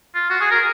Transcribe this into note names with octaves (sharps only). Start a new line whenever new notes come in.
F4
F#4
G#4
A#4